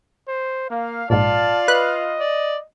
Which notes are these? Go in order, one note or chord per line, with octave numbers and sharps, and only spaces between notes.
C5
A#3 F5
A#1 G#2 F4 D5 F5 A5
B4 D#5 F#6
D5